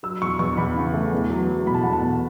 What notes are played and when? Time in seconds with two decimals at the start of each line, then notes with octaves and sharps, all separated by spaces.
0.03 F#3 E6
0.22 E2 C#6
0.39 E2 C#6
0.57 E2 B5
0.76 C#3
0.94 A3
1.13 E2
1.30 F#3
1.48 F#3
1.66 B2 B5
1.74 A5
1.83 E2 F#5
1.93 A5
2.02 B2